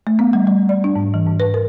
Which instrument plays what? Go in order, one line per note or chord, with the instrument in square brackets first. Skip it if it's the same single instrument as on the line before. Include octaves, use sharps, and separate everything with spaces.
[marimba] A3
B3
G3
G3
D5
D4
G#2
E3
G#2
B4
A#4